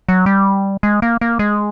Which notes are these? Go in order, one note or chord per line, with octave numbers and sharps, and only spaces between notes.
F#3
G3
G#3
A#3
A#3
G#3